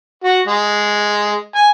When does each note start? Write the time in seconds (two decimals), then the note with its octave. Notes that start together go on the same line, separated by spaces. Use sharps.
0.24 F#4
0.47 G#3
1.56 G#5